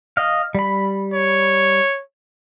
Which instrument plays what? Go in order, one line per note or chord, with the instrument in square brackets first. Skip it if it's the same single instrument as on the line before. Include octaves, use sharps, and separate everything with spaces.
[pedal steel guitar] D#5 F5
G3 B5
[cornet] C#5